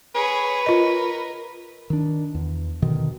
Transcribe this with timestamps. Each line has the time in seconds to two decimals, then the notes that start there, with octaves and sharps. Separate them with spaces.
0.15 G#4 B4 C#5
0.66 F4 A#4 D#5
1.90 D#3 D4
2.34 E2
2.82 B2 D3 D#3